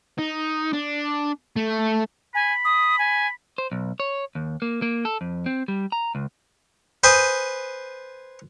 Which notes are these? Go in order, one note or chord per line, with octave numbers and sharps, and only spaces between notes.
D#4
D4
A3
G#5 B5
D#6
G#5
C5
B1
C#5
D#2
A#3
A#3
A4
F2
C4
G3
A#5
C#2
B4 C5 G#5 D#6